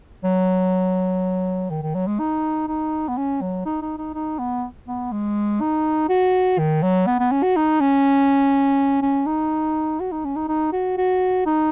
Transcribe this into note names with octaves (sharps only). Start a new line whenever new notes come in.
F#3
D#3
D#3
F#3
G#3
D#4
D#4
B3
C#4
F#3
D#4
D#4
D#4
D#4
B3
B3
G#3
D#4
F#4
D#3
F#3
B3
B3
C#4
F#4
D#4
C#4
C#4
D#4
F#4
D#4
C#4
D#4
D#4
F#4
F#4
D#4